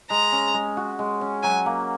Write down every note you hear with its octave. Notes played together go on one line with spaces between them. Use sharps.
G#3 A#5
C#4
G#3
F#4
G#3
C#4
F#3 G#5
A#3